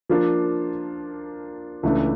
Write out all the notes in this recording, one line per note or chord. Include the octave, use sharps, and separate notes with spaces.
F3 A#3 D4 F4
C#2 C#3 E3 A3 D4